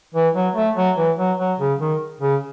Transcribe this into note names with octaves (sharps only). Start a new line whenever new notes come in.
E3
F#3
A3
F#3
E3
F#3
F#3
C#3
D#3
C#3